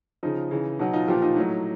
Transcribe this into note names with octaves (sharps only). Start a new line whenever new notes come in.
C#3 F3 D#4
C#3 E3
B2 F#3 D#4
D#4 F4
A#2 F3 F4 G4
D#4 F4
A2 F#3 D#4